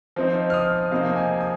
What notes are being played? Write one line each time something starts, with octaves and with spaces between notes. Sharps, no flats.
F3 C4 D#4
F6
D#6
C3 F3 A#3 D#4 F5
G#5
D#6